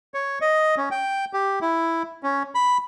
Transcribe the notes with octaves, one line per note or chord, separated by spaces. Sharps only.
C#5
D#5
C#4
G5
G4
E4
C#4
B5